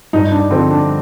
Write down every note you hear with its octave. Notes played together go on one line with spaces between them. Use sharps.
G2 D#4
D4
D3 F3 C4
D4